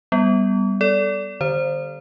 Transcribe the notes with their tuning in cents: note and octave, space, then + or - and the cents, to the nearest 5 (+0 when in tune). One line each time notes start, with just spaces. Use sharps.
G3 +0 B3 +0
A4 +0 D5 -25
D3 +25 C5 +5